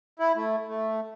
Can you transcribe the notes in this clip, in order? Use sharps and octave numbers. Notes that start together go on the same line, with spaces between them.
E4
A3
A3